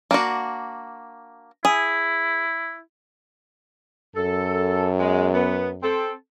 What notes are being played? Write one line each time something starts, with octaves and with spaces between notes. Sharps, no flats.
A#3 D4 F#4
E4 G#4
F#2 A4
G#3 B3
B3
C4 A4